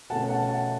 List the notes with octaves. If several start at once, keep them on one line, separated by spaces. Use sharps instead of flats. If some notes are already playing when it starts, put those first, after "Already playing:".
B2 A3 C#4 F#5 A5
F#5 A5
F#5 A5